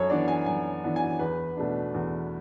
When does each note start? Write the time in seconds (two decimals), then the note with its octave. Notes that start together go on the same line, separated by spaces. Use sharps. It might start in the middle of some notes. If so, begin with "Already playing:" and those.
Already playing: F#2 A4 C#5
0.10 E3 B3 D4 D5
0.28 G#5
0.46 F#2 G#5
0.84 E3 B3 D4
0.96 G#5
1.19 E2 B4
1.57 B2 A3 D4
1.94 E2